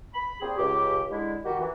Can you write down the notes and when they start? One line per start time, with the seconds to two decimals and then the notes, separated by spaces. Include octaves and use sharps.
0.14 B5
0.41 A#2 C4 G4 G#4
0.58 C#2 G4
1.10 D3 G#3 E4
1.44 D#3 F#4 G4
1.60 E3